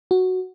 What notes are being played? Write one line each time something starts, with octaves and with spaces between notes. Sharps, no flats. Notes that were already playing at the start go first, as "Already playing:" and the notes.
F#4